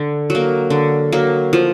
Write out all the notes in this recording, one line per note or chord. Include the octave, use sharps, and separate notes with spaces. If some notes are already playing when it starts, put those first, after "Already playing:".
Already playing: D3
F#3
A#3
D3
F#3 A#3
F3